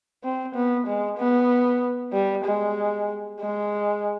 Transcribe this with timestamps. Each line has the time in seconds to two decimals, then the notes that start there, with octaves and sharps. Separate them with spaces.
0.24 C4
0.55 B3
0.87 G#3
1.18 B3
2.13 G3
2.45 G#3
3.40 G#3